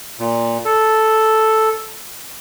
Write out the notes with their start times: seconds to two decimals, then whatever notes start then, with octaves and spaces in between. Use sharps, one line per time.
0.20 A#2
0.65 A4